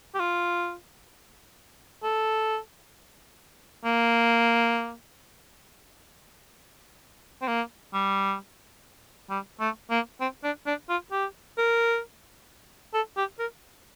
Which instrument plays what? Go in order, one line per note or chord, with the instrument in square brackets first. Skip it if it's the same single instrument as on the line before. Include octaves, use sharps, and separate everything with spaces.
[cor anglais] G4
F4
A4
A#3
C4
A#3
G3
G3
A3
A#3
C4
D4
D4
F4
G4
A#4
A4
G4
A#4